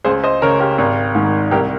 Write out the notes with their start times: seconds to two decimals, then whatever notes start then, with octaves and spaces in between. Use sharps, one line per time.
0.04 C#2 G#4 C5
0.24 C5 D#5
0.42 C#3 A#4 C#5
0.60 G4 A#4
0.78 G#1
1.15 G#2 D#3
1.51 C2 G4 A#4